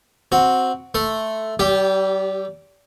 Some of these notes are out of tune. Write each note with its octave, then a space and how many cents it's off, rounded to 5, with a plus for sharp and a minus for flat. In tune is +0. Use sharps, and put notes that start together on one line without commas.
C4 +0 F#4 +0
A3 +0 C6 +0
G3 -35 G4 +0